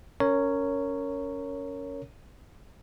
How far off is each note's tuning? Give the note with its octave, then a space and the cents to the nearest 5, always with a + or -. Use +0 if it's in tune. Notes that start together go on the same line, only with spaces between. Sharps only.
C#4 +10 A#4 -15 C#5 +5